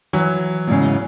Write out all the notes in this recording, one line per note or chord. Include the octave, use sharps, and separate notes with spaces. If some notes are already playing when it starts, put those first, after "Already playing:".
E3 F#3
E2 G#2 C#3